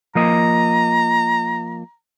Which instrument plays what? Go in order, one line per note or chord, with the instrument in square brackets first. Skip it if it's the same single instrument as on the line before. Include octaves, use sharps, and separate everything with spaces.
[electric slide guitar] F3 A#3 D#5 [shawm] A#5